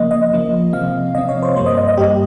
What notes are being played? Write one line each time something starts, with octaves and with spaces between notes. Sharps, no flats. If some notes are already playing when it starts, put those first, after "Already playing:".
Already playing: C#3 F3 A#3 D#5
D#5
C#3 F3 A#3
C3 F3 C4 F5
C3 F3 C4 D#5
C#5
C5
G2 G3 A#3 C5
D#5
D#5
D#5
G2 G3 A#3 G4